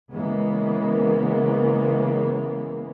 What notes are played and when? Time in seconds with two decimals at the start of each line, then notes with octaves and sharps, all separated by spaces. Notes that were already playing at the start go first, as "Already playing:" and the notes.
0.13 C#3 E3 G#3 A#3 B3